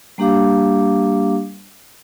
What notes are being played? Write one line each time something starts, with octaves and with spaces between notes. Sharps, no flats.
G3 A#3 D4 G4 F5 D6